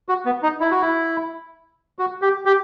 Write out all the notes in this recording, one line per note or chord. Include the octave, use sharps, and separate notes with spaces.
F#4
B3
D#4
E4
F#4
E4
F#4
G4
G4